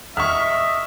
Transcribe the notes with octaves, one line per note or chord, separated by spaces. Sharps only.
D#5 E5 C#6 F6